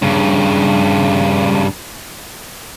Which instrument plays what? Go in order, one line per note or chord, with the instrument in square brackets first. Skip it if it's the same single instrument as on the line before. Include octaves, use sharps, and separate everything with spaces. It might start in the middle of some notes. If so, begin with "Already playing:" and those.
[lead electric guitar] G2 C#3